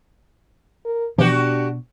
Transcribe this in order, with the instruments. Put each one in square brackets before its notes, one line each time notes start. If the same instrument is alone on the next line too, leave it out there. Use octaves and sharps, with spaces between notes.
[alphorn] A#4
[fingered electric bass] B2 [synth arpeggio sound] E3 F3 [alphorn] D4 [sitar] F#4 G4